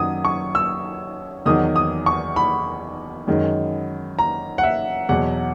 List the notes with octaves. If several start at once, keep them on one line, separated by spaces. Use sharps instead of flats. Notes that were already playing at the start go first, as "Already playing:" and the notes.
Already playing: F#2 D#3 F#3 D#6
C#6
E6
E2 D#3 F#3 D#6
D#6
C#6
B5
F#2 D#3 G#3
A#5
F#5
E5
E2 B2 F#3 F#5